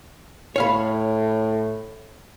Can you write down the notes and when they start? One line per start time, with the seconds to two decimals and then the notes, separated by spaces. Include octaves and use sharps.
0.56 A2 C#5 F5 B5